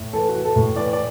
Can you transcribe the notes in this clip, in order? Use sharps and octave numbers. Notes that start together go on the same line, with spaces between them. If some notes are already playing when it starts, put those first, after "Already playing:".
Already playing: A2
E3 A4
F#4
E3
A4
A2
E3 D5
D5